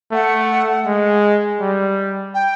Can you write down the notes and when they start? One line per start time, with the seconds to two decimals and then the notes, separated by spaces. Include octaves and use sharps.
0.12 A3 F#5
0.86 G#3
1.61 G3
2.34 G5